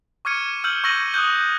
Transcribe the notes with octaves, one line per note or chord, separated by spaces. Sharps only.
C#6 D6 F6 G#6 C#7 D#7
E6 F6 G6 F#7
C#6 E6 A#6 D#7 F#7
D#6 E6 F#6 G6